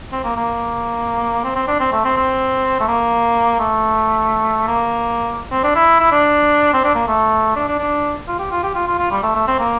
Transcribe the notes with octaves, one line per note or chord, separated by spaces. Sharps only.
C4
A#3
A#3
C4
C4
D4
C4
A3
C4
C4
A3
A#3
A3
A#3
C4
D4
E4
E4
D4
C4
D4
A#3
A3
D4
D4
D4
F4
G4
F4
G4
F4
F4
F4
G3
A3
A3
C4
A#3